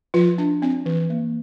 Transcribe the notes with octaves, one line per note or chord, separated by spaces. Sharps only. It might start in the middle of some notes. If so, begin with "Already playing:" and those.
F3 F4
D4
C4
E3
A#3